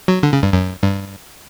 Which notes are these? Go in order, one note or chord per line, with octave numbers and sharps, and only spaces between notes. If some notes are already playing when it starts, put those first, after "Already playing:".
F#3
D3
C#3
G2
F#2
G2